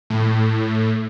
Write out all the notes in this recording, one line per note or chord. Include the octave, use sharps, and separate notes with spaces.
A2